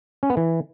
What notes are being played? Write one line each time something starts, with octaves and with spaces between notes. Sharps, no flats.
C#4
B3
E3